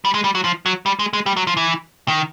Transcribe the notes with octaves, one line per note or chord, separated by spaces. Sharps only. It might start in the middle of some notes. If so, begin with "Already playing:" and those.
G3
G#3
G3
F#3
F3
F#3
G3
G#3
G#3
G3
F#3
F3
E3
D#3